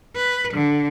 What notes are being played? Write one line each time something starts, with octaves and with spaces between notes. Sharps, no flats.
B4
D3